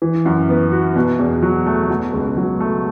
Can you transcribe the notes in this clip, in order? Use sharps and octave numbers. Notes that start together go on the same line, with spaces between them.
E3
F#2
B3
F#4
B2
E2
F#3
A3
B2
C#2
F#3
A3